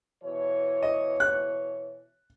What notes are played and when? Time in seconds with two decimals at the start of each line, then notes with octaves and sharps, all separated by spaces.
0.23 B2 E3 C#5
0.83 D#5
1.20 F#6